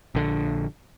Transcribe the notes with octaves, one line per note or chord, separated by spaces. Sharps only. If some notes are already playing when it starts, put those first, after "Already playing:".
A#1 D3